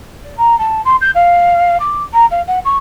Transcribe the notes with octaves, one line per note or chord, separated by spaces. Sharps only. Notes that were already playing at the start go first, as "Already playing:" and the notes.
D5
A#5
A5
C6
G6
F5
D6
A#5
F5
F#5
C#6